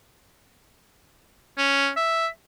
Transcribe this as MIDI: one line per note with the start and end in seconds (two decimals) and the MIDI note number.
1.57 1.90 61
1.96 2.27 76